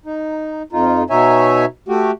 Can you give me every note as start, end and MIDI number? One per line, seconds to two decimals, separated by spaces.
0.06 0.62 63
0.73 1.03 41
0.73 1.03 63
0.73 1.03 65
1.10 1.65 47
1.10 1.65 63
1.10 1.65 73
1.10 1.65 76
1.10 1.65 80
1.89 2.11 57
1.89 2.11 66
1.89 2.11 67